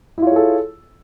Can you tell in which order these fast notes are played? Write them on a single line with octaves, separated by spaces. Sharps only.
E4 F4 C#5 G#4 A4